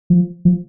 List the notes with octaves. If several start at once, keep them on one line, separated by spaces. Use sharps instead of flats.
F3
F3